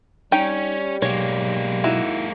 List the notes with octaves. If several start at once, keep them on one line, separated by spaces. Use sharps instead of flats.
G3 C#4 D#4 G5
B1 G#3 A#3 C#5
D#4 E4 F#4